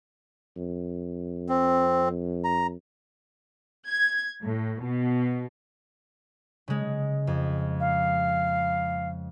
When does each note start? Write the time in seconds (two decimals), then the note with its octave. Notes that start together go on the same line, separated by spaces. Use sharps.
0.57 F2
1.49 C4
2.44 A#5
3.87 G#6
4.41 A2
4.82 B2
6.68 C#3 G#3
7.27 F2
7.80 F5